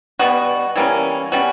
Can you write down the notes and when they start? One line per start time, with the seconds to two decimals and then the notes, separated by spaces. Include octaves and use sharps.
0.19 B2 G3 B3 F#4
0.76 E3 G3 A#3 C#4
1.32 B2 G3 C#4 F#4